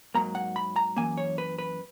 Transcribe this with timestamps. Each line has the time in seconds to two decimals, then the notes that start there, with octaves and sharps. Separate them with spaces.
0.15 G#2 F#3 A#3 A#5
0.35 F#5
0.56 B5
0.76 A#5
0.96 F#2 E3 A#3 G#5
1.18 C#5
1.38 B4
1.58 B4